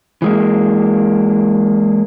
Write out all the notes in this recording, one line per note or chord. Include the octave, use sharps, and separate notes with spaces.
E3 G#3 A#3